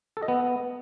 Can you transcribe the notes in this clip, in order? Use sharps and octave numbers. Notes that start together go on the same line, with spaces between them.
A4
D#5
B3